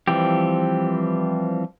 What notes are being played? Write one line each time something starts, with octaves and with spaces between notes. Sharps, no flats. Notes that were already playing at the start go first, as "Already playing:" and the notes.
E3 F3 G3 C4 G4